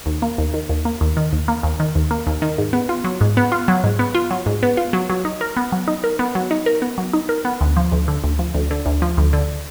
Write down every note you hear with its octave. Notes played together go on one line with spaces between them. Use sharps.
D#2
A#3
D#2
D#3
D#2
A#3
D#2
D#3
D#2
A#3
D#2
D#3
D#2
A#3
D#2
D#3
G#2
B3
F4
F#3
G#2
B3
F4
F#3
G#2
B3
F4
F#3
G#2
B3
F4
F#3
F#3
D#4
A#4
B3
F#3
D#4
A#4
B3
F#3
D#4
A#4
B3
F#3
D#4
A#4
B3
D2
F3
D2
D3
D2
F3
D2
D3
D2
F3
D2
D3